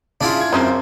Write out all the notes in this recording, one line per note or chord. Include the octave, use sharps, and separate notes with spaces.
C#3 D4 E4 F4
G#6
F#2 C#3 F3 A#3 C4